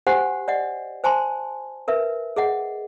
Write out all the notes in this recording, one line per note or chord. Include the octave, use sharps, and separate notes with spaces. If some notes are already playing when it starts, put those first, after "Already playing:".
F#4 G4 C5 F#5 G#5
D5 D#5 F#5
C5 G#5 A5 C6
A#4 B4 E5
G#4 D#5 F#5